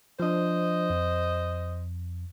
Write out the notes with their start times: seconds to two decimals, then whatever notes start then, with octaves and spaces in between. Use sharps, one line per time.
0.20 F3 D4 C5 D#5
0.90 F2